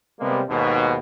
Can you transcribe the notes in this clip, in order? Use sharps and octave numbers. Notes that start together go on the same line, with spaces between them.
C3 G3 G#3 A#3 B3
D#2 G#2 B2